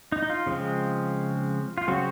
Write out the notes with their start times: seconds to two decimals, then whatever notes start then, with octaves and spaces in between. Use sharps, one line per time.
0.12 D#4
0.22 D#4
0.30 F4
0.46 C#3 F3 G#3 C4
1.78 F4
1.88 C#3 F#3 C4 F#4